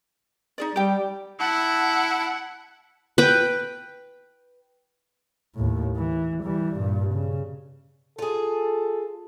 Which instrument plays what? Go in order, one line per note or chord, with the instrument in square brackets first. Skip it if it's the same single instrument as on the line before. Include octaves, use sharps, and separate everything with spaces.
[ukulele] D#4 G#4 D5
[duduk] G3 [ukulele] G4 G5
[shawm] E4 [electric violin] F#5 [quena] A5
[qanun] B4 G5
[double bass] D#2 A2
E3
E3 G3
G2 A#2
C#3
[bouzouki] F4 G#4 [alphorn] A4